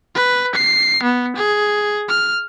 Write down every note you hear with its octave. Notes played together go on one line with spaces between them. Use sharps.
B4
C7
B3
G#4
F6